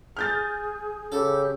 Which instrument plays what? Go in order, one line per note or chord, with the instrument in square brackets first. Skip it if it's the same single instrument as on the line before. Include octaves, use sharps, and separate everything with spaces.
[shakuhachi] G#4 [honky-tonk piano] F6 G6 A6
[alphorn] C#3 [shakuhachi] G4 [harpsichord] A4